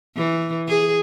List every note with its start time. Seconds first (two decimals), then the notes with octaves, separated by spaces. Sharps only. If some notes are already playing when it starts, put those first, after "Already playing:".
0.16 E3
0.68 G#4